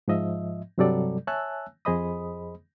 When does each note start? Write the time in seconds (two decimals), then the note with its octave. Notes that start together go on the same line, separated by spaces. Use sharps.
0.08 G#2 F3 D#5 E5
0.78 G2 C3 F#3 G3 A4 D5
1.27 C#5 E5 G#5 A5 E6 F#6
1.85 F2 G#4 C5 D#5 B5 D#6